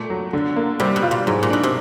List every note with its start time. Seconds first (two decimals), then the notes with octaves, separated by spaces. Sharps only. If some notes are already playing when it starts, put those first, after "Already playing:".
Already playing: A#2 A3
0.10 F#3
0.33 D3
0.56 A#3
0.80 C3 G3
0.96 B2
1.03 F4
1.11 A#2
1.27 G#2 F#3
1.43 A#2
1.50 B2 D4
1.63 C3